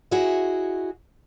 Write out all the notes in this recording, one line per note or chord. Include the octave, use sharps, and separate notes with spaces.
E4 F#4 G#4 C#5 D#5 E5